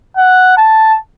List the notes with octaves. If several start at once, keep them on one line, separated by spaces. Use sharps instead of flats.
F#5
A5